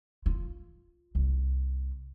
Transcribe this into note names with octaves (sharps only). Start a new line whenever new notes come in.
F4
C2